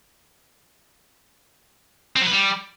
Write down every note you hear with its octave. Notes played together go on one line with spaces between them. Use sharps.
C4
F#3
B4
G3